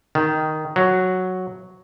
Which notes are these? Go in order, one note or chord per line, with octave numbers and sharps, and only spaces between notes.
D#3
F#3